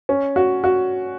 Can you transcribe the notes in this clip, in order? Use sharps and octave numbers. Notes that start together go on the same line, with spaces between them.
C#4
F#4
F#4